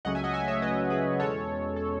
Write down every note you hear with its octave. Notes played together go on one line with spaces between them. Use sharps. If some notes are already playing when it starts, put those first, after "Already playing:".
C#2 C#3 F#3 A3 C#4 D#5 F#5
E5 G#5
D#5 F#5
E5 G#5
C#5 E5
B4 D#5
G#4 B4
E2 B2 G#3 C#4 A4 C#5
A4